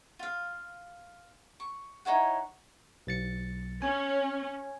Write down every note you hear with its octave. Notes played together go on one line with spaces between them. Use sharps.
F4 F5
C#6
D#4 E4 C#5 F#5
B1 A6 C#7
C#4 G#5